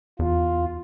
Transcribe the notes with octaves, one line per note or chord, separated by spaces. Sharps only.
E2 F4